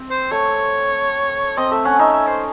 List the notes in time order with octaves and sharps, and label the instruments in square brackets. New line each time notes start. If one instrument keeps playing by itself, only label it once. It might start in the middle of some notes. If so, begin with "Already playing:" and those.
Already playing: [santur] C4
[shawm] C5
[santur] A3 [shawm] C#5
[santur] C4 [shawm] D#5
[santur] A3 [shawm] E5
[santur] C#4 [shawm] F#5
[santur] D#4 [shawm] E5
[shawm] E5
C5